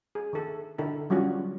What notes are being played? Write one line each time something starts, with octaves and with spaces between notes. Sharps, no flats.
G#4
D#3 A4
D3 E4 A4 A#4
F#3 G3 C#4 F4 F#4